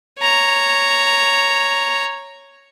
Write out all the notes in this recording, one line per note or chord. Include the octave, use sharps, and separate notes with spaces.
C#5 A#5